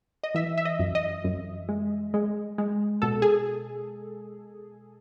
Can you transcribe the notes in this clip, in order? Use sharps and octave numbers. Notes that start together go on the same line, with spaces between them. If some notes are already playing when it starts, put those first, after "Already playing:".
D#5
E3 E5
E5
D#5
F#2
D#5
F#2
G#3
G#3
G#3
B2 A4
G#4